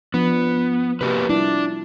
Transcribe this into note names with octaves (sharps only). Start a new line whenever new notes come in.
F3 B3 D4
C3 A#3 F#4 G4 B4
G3 D4 E4 F4